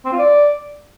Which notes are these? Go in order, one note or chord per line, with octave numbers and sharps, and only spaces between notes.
C4
F4
D5